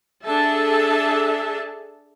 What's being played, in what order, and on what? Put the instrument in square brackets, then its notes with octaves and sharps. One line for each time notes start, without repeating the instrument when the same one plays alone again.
[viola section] D4 G#4 A4 E5 A5